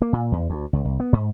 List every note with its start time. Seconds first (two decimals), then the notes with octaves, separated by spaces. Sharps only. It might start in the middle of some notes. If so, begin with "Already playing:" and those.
0.02 A#3
0.13 A#2
0.32 E2
0.50 D2
0.73 C#2
0.85 C2
1.00 B3
1.13 G#2